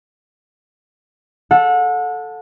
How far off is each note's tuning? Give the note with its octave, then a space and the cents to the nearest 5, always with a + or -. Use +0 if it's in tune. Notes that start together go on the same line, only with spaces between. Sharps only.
A4 +0 F#5 -35